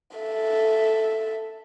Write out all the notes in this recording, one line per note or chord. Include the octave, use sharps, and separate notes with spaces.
A4 E5